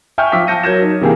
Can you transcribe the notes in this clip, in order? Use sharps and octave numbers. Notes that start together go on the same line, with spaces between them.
E5 G5 G#5 C#6 F6 G6
F3 F4 G5 D6 E6 B6
A5 G6 A#6 C#7 D#7
F#3 A#4 G6 G#6 A#6 E7
D#4
C3 E3 A#3 G4 G#4